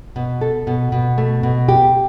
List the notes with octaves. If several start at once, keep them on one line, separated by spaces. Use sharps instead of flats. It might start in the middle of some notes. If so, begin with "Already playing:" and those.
B2
A4
B2
B2
A3
B2
G4